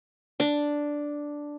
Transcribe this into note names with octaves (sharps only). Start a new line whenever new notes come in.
D4